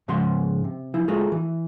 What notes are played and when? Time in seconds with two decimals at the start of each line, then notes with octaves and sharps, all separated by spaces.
0.08 G#2 C#3 F3 G#3 F#5 C6
0.64 C3
0.94 F3 E4
1.08 G#3 A3 F4 F#4 G#4
1.32 E3